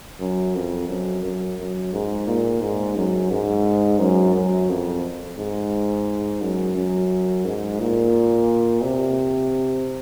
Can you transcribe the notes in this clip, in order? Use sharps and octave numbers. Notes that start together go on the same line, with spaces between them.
F#2
F2
F#2
F#2
F#2
G#2
A#2
G#2
F#2
G#2
F#2
F#2
F2
G#2
F#2
F#2
G#2
A#2
C3